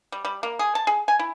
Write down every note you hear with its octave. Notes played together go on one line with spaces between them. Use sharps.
G3
G3
A#3
G#4
A5
G#4
G#5
E4